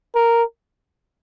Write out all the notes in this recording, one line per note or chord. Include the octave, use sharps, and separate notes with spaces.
A#4